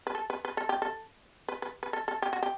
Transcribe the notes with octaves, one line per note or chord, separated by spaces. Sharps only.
B4
A4
B4
B4
A4
G4
A4
B4
B4
B4
A4
A4
G4
F#4
G4